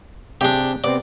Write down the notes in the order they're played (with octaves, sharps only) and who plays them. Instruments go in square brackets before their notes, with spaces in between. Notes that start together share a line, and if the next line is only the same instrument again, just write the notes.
[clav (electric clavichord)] C3 G#4 D5 [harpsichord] D4 G4
[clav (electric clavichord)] C3 B3 C4 [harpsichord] D5